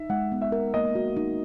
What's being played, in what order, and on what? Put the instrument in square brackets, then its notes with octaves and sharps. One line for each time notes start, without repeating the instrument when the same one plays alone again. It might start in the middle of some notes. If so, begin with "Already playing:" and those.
Already playing: [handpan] D#4 [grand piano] E5
[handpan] G#3 [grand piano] F#5
[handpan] B3
[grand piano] E5
[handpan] A#4
[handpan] A#3 [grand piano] D#5
[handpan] F#4
D#4